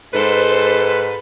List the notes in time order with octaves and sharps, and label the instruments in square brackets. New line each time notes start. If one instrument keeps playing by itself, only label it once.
[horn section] G#2 B4 [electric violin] A4 C5